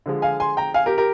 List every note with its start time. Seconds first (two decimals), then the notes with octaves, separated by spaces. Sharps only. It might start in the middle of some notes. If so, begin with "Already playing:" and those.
0.06 D3 F3 G#3
0.22 F5 G#5
0.40 G#5 C6
0.57 G5 A#5
0.74 F5 G#5
0.86 G4 A#4
0.98 G4 A#4